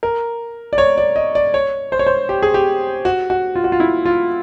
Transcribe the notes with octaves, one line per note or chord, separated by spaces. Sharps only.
A#4
D5
C#5
D5
D#5
D5
C#5
C5
C#5
C5
G4
G#4
G4
F#4
F#4
F4
F#4
F4
E4
F4